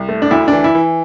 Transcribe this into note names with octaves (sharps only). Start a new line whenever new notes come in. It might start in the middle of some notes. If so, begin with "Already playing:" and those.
Already playing: C2
A3
D4
D2 E4
D4
E3
E4
E3